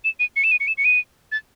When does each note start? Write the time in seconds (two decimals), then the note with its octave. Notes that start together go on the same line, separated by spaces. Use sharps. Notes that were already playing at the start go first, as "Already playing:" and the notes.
0.04 E7
0.20 D#7
0.36 C#7
0.44 E7
0.51 D#7
0.60 C#7
0.68 E7
0.78 C#7
0.85 D#7
1.32 A6